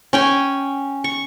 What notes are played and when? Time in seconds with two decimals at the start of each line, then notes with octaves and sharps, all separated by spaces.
0.13 C#4 G5 G#5
1.04 C#6